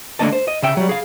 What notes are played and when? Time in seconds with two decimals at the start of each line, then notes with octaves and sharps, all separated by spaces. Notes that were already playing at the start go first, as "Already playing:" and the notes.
0.19 D3 A3 A#3 D#5 A5
0.33 C5
0.48 D#5
0.63 C#3 E5 G5
0.77 F#3 G3
0.89 G#4 F5